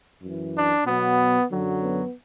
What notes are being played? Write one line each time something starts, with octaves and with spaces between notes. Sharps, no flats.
F#2 E3
D4
B2 F#3 B3
F#2 D3 F#3
B3